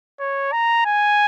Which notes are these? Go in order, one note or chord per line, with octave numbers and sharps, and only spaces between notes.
C#5
A#5
G#5